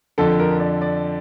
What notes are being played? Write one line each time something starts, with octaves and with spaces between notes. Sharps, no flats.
F2 D3 F3 A4
A#4
D5
D5